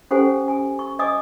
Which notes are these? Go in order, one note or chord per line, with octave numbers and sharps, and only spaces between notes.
C#4 G4 A4 C5 F#5 G#5
G#5
C#6
D5 D#5 G#5 D6 D#6